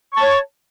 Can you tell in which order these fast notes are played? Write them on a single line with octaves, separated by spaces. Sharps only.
C#6 A5 C#5